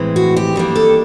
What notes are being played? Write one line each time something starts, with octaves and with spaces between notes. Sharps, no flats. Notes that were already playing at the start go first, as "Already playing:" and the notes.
Already playing: A2 E3 G#3 C4
F#4
G4
D#3 G3 A#3 D4
A4